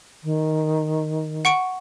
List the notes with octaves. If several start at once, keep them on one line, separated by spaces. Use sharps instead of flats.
D#3
F#5 C#6 D7